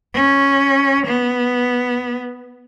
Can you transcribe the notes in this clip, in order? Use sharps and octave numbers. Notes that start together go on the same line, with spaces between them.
C#4
B3